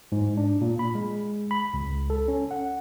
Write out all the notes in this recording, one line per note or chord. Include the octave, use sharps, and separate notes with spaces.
G#2
D4
A#2
B5
G#3
B5
C#2
A4
C#4
F#5